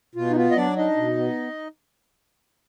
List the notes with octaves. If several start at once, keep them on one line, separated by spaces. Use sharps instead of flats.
B2 F4
D#4
B3 F4
D#5
F#3 D4 D5
D4 D#4 D#5
B2
B3